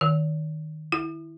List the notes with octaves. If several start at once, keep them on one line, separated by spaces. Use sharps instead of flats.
D#3
E4